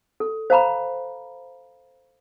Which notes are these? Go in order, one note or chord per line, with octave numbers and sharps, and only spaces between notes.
A4
C5 F5 A#5 B5